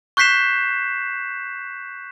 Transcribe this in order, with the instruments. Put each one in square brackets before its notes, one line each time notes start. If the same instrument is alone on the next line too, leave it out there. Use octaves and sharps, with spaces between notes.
[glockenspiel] C#6 F#6 G6 B6 C7 E7